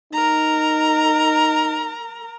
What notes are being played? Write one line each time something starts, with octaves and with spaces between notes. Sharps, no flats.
D#4 A#4 A#5